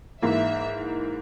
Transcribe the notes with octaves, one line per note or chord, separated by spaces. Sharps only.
G#2 E3 A#3 E5